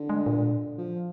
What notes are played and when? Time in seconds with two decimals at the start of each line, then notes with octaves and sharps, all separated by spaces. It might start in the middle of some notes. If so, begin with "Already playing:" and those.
Already playing: D3
0.09 G#3
0.26 A#2
0.78 F3